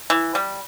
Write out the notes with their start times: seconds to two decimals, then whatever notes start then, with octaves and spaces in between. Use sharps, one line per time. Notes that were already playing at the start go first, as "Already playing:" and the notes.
0.10 E3
0.35 G3